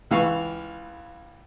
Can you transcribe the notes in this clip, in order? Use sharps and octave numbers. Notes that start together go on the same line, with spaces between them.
C#2 E3 F5 C#6